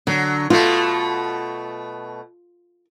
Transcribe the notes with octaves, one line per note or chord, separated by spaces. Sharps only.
D3 F#3
B2 A3 F4